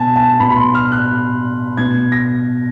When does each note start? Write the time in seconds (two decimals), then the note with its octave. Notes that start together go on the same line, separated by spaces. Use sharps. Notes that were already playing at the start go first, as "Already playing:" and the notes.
Already playing: B2 G#5 A5
0.16 A5
0.40 B2 B5
0.51 B5
0.56 C6
0.75 F6
0.92 F#6
1.77 B2 G#6
2.12 A#6